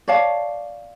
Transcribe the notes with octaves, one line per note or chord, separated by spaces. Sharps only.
C#5 D5 F5 A5